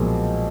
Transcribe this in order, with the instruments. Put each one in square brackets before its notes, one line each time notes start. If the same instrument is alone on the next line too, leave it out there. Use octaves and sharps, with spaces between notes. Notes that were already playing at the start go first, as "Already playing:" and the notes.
Already playing: [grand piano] B1 A#2 F3 G#3